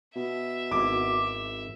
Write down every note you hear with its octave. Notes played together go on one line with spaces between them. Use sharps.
B2 E5
G#1 E4 D6